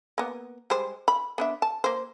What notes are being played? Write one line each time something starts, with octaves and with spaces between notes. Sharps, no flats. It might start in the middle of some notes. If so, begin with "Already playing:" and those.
A#3 B3
G3 G#3 C5
B5
B3 D4 E5
A5
A#3 C5